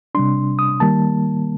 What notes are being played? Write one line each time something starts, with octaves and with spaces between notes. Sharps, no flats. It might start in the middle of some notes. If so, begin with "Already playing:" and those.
C3 G3 D4 C6
D#6
D#3 G3 A#3 A5